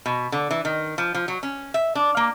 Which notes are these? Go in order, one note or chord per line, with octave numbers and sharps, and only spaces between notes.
B2
D3
E3
D#3
F3
F3
F#3
C#4
E5
D4
A#3